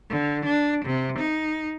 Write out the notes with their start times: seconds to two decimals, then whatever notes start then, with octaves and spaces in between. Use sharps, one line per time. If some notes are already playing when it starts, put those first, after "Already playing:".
0.10 D3
0.45 D4
0.85 C3
1.19 D#4